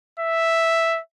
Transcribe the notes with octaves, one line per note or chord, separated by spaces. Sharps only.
E5